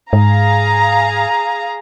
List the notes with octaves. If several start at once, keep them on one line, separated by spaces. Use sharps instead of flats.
G#2 G#4 F5 A#5